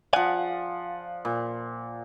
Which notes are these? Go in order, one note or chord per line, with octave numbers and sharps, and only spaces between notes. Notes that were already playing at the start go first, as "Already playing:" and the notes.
F3 D5 F5 F#5 G#5
A#2